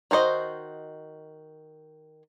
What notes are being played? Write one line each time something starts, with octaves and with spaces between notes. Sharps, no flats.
D#3 F#4 C5 D#5